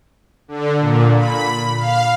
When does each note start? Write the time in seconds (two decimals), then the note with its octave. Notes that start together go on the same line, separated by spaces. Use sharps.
0.48 D3
0.80 A#2
1.17 B5
1.78 F5